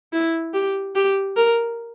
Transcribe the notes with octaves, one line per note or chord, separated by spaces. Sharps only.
E4
G4
G4
A#4